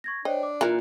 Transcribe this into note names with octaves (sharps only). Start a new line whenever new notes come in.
C#6 G#6 A#6
D4 C5 C#5 D#5 G5
D6
A#2 E3 A#4 F#6